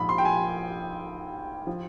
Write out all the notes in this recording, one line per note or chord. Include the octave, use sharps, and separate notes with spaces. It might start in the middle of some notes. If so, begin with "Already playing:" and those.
Already playing: A#1 G#2 F3 B5
C6
G5
G#5
F3